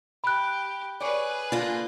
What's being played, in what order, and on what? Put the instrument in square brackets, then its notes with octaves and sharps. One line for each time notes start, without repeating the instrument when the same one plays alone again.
[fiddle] G4 [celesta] B5 F#6
[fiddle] G#4 B4 [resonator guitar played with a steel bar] C#5 D5
[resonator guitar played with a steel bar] D3 [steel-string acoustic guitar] A#3 F4